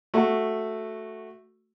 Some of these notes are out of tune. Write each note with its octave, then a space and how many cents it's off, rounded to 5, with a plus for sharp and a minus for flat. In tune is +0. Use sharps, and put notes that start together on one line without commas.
A3 +0 F#4 +0